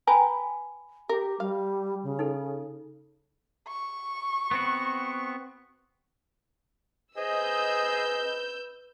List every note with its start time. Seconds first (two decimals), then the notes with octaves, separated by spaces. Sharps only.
0.07 B4 G5 G#5 A#5 B5
1.09 G4 A#4
1.40 G3 F5
2.03 C#3
2.19 D#4 A4
3.68 C#6
4.51 B3 C4 F#4
7.17 G#4 B4 C5 D#5 E6 G6